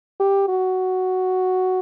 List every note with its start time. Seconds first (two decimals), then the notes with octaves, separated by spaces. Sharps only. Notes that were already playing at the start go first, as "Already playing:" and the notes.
0.20 G4
0.48 F#4